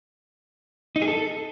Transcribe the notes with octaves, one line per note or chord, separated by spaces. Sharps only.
D#4
G#4
A4